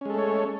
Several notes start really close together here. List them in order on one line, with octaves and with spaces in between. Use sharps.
C#4 G#3 A4 A3 C#5